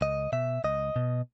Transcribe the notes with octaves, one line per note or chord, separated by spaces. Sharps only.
C#2 D#5
B2 E5
C#2 D#5
B2